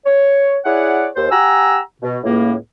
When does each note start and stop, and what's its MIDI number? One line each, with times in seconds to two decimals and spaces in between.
0.05 0.55 73
0.65 1.06 64
0.65 1.06 68
0.65 1.06 73
0.65 1.06 74
0.65 1.06 78
1.16 1.26 39
1.16 1.26 72
1.30 1.78 67
1.30 1.78 78
1.30 1.78 80
1.30 1.78 82
1.30 1.78 88
2.02 2.18 47
2.23 2.55 37
2.23 2.55 45
2.23 2.55 58